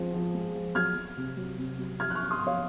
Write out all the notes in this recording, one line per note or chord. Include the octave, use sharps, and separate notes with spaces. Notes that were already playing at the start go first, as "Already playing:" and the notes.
Already playing: F3 G#3 C4
F3
G#3
F3
F#3 F6 G#6
F#3
C3
F#3
C3
F#3
F3 F6 G#6
F#6
C#6 F6
C#4
C6 D#6
F3
C#5 F5